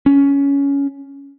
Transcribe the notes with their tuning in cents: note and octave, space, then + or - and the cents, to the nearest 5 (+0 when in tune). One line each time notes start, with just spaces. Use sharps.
C#4 +15